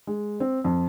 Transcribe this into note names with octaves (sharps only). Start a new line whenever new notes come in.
G#3
C4
F2